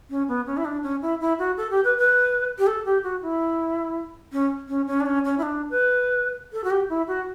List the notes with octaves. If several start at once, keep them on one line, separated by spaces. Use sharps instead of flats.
C#4
B3
C#4
E4
D4
C#4
E4
E4
F#4
A4
G4
B4
B4
G4
A4
G4
F#4
E4
C#4
C#4
C#4
D4
C#4
C#4
E4
D4
B4
A4
F#4
G4
E4
F#4